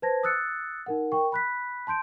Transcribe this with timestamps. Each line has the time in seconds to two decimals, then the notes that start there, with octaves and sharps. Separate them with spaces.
0.02 B4 C5 A5 G#6 A#6
0.23 D#6 E6 F#6 A6 C#7
0.86 D#4 A#4 F#5
1.12 A#4 G5 C#6
1.32 B5 F#6 B6
1.87 A5 C6 G6 D7